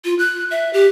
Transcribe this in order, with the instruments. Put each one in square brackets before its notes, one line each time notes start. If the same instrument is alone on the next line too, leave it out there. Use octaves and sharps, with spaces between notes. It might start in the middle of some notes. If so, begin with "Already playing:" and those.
[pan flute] F4
F#6
E5
G4